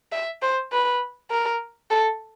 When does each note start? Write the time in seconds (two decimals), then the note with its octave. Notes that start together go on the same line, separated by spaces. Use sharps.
0.12 E5
0.42 C5
0.72 B4
1.31 A#4
1.91 A4